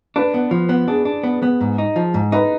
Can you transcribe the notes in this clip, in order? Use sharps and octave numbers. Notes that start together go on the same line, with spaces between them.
D4 B4
B3
F3
B3
D4 G#4
D4
B3
B3
G#2
D#4
F3
G#2
D#4 B4